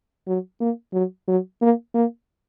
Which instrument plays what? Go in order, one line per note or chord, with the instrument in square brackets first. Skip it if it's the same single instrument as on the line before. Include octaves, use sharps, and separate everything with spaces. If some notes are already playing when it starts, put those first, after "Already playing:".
[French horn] F#3
A#3
F#3
F#3
A#3
A#3